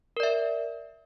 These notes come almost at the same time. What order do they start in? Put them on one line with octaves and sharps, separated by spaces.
A#4 D5 E5